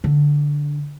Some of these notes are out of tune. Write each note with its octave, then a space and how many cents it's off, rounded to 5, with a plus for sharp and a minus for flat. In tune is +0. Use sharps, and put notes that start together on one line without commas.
D3 -5